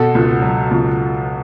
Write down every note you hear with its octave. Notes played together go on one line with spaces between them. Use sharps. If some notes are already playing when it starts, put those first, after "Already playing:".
Already playing: B2 F#4 A4
C#2
F#3
C#2